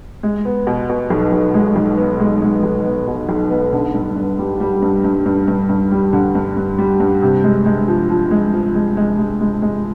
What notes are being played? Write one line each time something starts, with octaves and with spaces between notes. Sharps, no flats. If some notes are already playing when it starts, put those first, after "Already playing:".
G#3
B3
B2
B2
B1
B1
G#3
B1
B3
G#3
G#3
B1
B3
B2
B1
B3
D3
G2
G2
G3
G3
G2
G2
G2
G2
G2
G3
D3
G2
G2
G3
G2
C3
G#3
G#3
F3
F3
G#3
F3
G#3
G#3
G#3
G#3
G#3